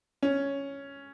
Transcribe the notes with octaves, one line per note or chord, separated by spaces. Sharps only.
C#4